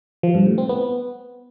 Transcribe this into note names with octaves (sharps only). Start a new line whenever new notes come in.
F3
G2
A2
C4
B3